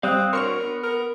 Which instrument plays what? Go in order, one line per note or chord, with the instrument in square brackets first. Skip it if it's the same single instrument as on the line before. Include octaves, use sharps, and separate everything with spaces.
[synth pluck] G3 [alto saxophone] C4 [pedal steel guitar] F5 D#6 F#6
[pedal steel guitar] D4 F#4 C#5 [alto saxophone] A#4 [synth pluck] C6 C#6 F6
[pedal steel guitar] B3
[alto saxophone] A#4